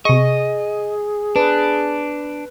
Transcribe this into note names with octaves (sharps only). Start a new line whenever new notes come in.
C3 G#4 D#5 C#6
D4 B4